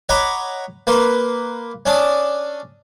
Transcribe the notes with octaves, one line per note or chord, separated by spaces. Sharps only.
C#5 D#5 F#5 A#5 B5 D6
A#3 B4 C6
C#4 D4 A5 D#6